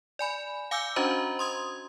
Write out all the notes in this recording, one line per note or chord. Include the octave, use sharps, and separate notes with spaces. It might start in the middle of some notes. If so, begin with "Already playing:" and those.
D5 G#5 B5
F5 G#5 D6 E6 G6
C#4 D4 F#4 C5 D#5 A#5
C6 D#6 G#6